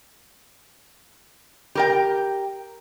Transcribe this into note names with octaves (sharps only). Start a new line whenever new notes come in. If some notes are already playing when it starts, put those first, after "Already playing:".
G4 A#4 G5